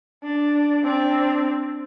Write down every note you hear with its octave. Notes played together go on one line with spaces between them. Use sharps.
D4
C4 D4